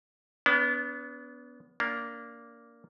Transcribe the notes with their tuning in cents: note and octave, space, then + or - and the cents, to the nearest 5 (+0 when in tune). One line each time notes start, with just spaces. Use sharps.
B3 +0 D4 -45
A#3 +0 D4 -20